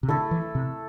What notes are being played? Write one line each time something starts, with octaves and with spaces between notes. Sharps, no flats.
C3
D3 A3 E4 A4
E3
C3